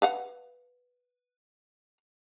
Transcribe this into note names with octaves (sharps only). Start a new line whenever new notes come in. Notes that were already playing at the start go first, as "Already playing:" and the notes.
B4 F5 F#5